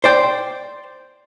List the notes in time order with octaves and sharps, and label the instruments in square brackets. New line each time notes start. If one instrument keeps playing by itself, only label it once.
[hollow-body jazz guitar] C5 D5 G5